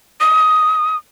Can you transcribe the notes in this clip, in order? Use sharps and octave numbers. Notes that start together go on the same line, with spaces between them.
D#6